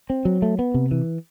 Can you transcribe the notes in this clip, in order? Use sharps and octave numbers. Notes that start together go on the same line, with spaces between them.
C4
F#3
A3
B3
C3
E3